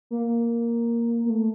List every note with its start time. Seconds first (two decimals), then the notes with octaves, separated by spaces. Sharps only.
0.11 A#3
1.25 A#3
1.30 A3